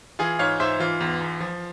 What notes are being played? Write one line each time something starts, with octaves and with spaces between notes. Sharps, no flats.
E3 F4 G#4
G#2 C#5 F5
G#2 C5 E5
E3 F4
E2
E2
F3